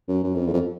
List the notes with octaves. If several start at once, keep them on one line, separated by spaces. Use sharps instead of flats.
F#2
F#2
F2
E2
F2